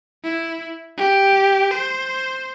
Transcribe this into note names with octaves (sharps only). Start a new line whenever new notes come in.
E4
G4
C5